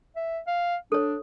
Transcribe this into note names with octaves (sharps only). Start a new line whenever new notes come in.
E5
F5
D4 A4 C#5